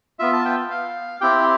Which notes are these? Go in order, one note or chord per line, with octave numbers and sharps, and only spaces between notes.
B3 F4 E5
A5
G5
F5
C4 E4 G4 G5